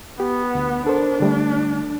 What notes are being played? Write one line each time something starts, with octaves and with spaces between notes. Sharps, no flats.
B3 G4
D2
D4 A4 A#4 C5
D3 G3 A3